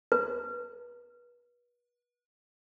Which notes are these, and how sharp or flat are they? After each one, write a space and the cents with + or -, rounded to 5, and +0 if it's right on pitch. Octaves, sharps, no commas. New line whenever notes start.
B4 -30